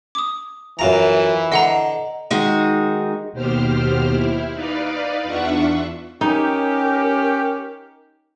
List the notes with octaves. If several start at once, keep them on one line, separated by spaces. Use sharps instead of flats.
D6 D#6
F#2 E3 F4 A#5
D3 D#5 F#5 A#5 C6
D#3 G#3 D#4 F#4
D#2 B2 G4 C5 F6
E4
D#4 B4 D5 F5
E2 D4 F4 E5 F#5 C#6
C#4 D#4 G4 A#4